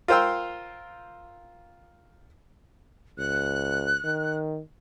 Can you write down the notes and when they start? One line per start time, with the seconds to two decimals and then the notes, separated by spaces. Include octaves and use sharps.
0.08 F4 A#4 C5 G5 E6
3.18 C#2 F#6
4.04 D#3